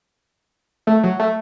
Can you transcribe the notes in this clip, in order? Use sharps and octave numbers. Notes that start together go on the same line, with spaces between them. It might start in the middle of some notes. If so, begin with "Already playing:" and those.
A3
F#3
A3